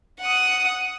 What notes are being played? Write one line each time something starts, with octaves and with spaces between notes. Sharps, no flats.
F#5 D#6